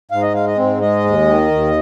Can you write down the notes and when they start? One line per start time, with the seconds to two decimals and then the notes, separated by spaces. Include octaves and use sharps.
0.11 G#2 F5
0.22 D#5
0.34 G#3 F5
0.47 D#5
0.58 G#2 C4
0.81 G#3 D#5
1.04 D#2
1.28 D#3
1.51 D#2